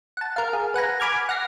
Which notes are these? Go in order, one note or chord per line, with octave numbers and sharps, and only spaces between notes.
F#5 A5
A#4 F5
G#4
B4 F#5 G#5 A#5
G#5 B5 D6 F6 G#6
F#5 F6 A#6 C7